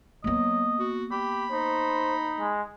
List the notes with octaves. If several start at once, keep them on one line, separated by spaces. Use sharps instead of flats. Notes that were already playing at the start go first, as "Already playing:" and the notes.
F#3 A#3 B3 D#5
F#4
G4 B5
D#4 C5
G#3